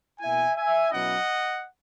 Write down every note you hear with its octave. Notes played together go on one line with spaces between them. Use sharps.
B2 A#3 E4 E5 G#5
E5 G#5
B2 F#3 C#4 E4 D#5 F#5